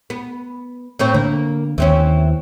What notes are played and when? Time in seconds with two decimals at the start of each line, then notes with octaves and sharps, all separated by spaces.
0.10 B3
0.99 A2 C4 C#5
1.14 D3 A#3
1.78 D#2 E3 C4 C#4